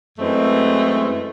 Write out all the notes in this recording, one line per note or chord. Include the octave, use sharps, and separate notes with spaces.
F#2 E3 G#3 A3 C4